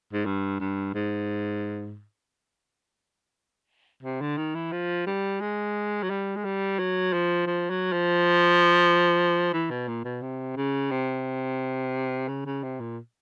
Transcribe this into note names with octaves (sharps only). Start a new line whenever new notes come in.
G#2
G2
G2
G#2
C3
D3
D#3
E3
F3
G3
G#3
F#3
G3
G#3
G3
F#3
F3
F3
F#3
F3
E3
B2
A#2
B2
C3
C#3
C3
C#3
C#3
C3
A#2